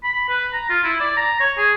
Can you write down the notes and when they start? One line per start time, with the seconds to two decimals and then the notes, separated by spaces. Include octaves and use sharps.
0.04 B5
0.29 B4
0.53 A#5
0.70 F4
0.84 E4
1.00 D5
1.17 A#5
1.40 C#5
1.57 G#4